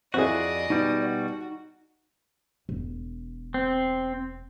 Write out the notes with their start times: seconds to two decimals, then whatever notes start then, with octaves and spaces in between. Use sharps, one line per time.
0.14 F2 C4 E4 F#4 G#4 D5 D#5
0.70 B2 G3 D#4
1.02 F#4
2.69 E1
3.54 C4